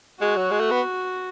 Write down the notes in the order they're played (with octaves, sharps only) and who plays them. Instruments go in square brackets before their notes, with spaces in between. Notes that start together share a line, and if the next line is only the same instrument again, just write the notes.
[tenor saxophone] G#3 [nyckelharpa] F#4
[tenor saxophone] F#3
G#3
A3
B3